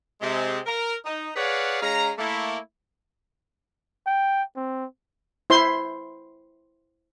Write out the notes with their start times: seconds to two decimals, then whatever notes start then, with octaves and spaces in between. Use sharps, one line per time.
0.21 C3 G#3 C4
0.66 A#4
1.05 D#4
1.36 G#4 B4 C#5 D5 F5 F#5
1.81 G#3 C#4 F5 A#5
2.18 A3 A#3 E4
4.07 G5
4.56 C4
5.50 E4 C5 C6